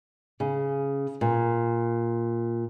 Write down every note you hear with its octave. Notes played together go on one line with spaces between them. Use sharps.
C#3
A#2